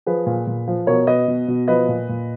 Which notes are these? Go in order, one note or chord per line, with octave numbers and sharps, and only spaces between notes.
F3 G#4 B4
A#2
A#2
F3
B2 A#4 C#5
B2 B4 D#5
B2
B2
F3 B4 D#5
A#2
A#2